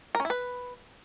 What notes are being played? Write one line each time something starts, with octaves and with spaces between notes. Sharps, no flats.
A#4
C#4
E4
B4